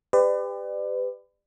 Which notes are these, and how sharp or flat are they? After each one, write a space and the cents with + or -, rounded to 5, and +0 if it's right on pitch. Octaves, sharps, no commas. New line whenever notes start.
G4 +25 B4 +35 D5 +25